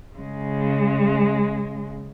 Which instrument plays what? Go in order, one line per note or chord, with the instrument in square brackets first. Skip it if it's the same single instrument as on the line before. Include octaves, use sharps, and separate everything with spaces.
[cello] C#3 G#3